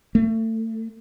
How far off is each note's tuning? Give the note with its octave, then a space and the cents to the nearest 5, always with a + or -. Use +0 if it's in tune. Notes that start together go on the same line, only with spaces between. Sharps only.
A3 +30